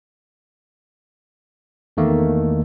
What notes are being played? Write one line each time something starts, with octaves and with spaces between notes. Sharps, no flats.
E2 D#3 A3 A#3